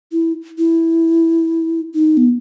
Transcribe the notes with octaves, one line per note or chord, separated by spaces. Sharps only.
E4
E4
D#4
B3